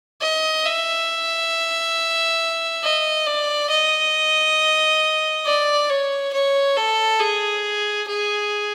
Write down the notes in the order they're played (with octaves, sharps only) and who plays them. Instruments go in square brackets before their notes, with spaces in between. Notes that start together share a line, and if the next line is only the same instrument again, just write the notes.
[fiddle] D#5
E5
D#5
D5
D#5
D5
C#5
C#5
A4
G#4
G#4